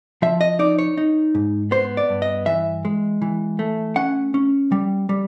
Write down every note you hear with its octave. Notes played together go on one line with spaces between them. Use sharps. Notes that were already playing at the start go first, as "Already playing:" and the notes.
F3 E5
D#5
D#4 D5
C#5
D#4
G#2
B3 C5
D5
G2
D#5
E3 E5
G#3
E3
A3
C#4 F#5
C#4
G3
G3